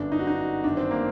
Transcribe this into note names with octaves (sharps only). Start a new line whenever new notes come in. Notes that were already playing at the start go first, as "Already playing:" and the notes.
Already playing: G1 F#2 D3 D4
D#4
F#4
D#4
G1 F#2 D#3 D4
C4
A#3